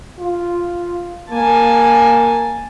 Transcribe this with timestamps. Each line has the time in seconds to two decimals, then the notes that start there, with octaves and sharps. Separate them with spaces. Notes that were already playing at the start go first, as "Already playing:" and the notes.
0.19 F4
1.31 A#3 G#5 A5